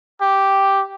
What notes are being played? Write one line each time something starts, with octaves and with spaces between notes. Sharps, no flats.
G4